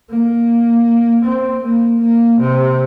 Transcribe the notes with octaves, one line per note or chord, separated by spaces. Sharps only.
A#3
C4
A#3
A#3
C3